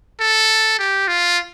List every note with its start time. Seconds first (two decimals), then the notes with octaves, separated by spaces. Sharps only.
0.20 A4
0.79 G4
1.08 F4